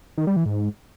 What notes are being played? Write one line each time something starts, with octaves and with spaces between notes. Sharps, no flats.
D#3
G3
E3
G#2